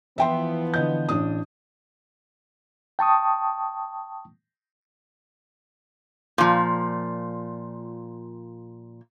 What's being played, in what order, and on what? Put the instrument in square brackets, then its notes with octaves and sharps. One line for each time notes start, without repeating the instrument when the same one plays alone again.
[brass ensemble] E3 F3 B3 [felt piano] E5 G5 C6
[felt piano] D3 D#5 G6
A1 D4 D#6
[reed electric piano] G5 A5 C#6 D#6
[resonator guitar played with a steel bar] A#2 F3